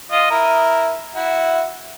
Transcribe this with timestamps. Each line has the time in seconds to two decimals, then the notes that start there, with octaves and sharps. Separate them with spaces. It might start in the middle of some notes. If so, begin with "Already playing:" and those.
0.11 F4 D#5
0.30 E4 A#4
1.15 E4 F#4